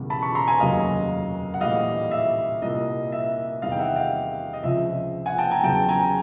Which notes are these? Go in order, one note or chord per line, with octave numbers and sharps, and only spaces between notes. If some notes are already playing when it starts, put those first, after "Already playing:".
Already playing: E1 E2 C#3 E3 G3
A5 B5
B5 C#6
A#5 C6
G#5 A#5
F1 D#2 C#3 F#3 D#5 F5
F#5
A#1 A2 E3 G3 D#5 F5
E5
C2 A#2 G3 D#5
E5
E2 C3 D#3 G3 D#5 F5
G5
E5 F#5
F5 G5
D#5
C#2 C3 F3 E5
F#5 G#5
G5 A5
G#5 A#5
E2 C#3 F#3 G5 A5
G#5 A#5